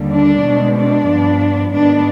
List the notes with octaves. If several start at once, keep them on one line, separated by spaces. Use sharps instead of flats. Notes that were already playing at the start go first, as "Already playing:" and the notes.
Already playing: D#2 D3 G3
D4
B2 G#3 C4
D4
G2 F3 B3
G#2 D#3 B3 D4